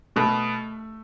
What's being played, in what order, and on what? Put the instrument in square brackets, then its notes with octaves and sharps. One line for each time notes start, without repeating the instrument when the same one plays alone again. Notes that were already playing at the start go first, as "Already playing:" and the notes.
[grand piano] B2 [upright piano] A3